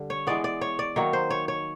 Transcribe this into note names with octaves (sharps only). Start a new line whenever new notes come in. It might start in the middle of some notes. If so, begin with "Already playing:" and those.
Already playing: D3 G3
C#5
E3 G#3 B3 D5
D5
C#5
D5
D#3 F#3 A#3 C#5
C5
C#5
C#5